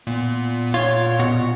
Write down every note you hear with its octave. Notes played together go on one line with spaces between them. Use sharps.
A#2 B3
A#2 F4 C#5
B2 F#4